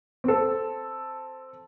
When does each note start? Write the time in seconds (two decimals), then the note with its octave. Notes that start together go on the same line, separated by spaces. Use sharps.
0.24 C4 A4